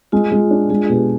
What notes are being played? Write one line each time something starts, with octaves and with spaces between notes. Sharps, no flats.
G#3 F4
G#3
D4
G#3 F4 G#4
B2 G4 B4